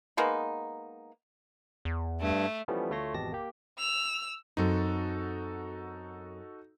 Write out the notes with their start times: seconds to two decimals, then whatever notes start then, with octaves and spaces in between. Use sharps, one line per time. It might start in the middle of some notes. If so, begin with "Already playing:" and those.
0.17 G#3 A#3 B3 D#4
1.85 E2
2.21 G2 A3
2.68 E3 F3 G3 A3 B3 C#4
2.90 D2 A3 F4 C#5 C6 A#6
3.14 G#1 E2 B2 G4 A5 A#6
3.32 A#3 G4
3.79 E6 F7
4.57 F#2 C4 D#4 F#4 A4